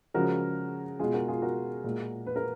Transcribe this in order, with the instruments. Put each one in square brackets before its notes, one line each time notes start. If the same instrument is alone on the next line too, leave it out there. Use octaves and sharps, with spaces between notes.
[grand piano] C#3 F3 G#3 F#4 A#4
B2 G#3 F4 G#4
F#4 A#4
F4 G#4
F#4 A#4
A#2 G#3
B4
A#4